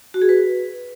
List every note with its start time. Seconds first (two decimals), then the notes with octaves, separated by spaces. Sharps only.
0.14 F#4
0.22 G#4
0.29 B4